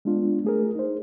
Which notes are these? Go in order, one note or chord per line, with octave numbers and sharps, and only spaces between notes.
G#3 B3 D4 F4
A3 G#4 A#4
D#4 C5